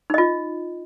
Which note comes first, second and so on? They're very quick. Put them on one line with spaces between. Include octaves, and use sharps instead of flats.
D#4 D#5 F4